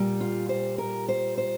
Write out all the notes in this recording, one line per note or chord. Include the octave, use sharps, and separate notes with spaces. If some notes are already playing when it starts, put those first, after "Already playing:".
Already playing: A#2 G3
F4
C5
A#4
C5
C5